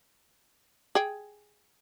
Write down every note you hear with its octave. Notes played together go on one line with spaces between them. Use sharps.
G#4 G5